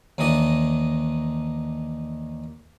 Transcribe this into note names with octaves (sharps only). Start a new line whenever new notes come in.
D#2 D#3 E3 D4 D#5